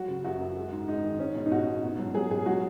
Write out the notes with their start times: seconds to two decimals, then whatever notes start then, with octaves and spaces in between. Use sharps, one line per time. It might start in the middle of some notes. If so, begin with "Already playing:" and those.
Already playing: F#3 F#4
0.08 C#3
0.24 F#2 F#4
0.40 F#2
0.57 G#3
0.72 G#2
0.88 G#3 D#4
1.04 D#3
1.19 G#3 C#4
1.35 B2
1.46 D#4
1.52 B2 F#4
1.67 B2
1.83 B2
1.99 F#3
2.14 F#3 G#4
2.31 B2 G#4
2.46 F#3 F#4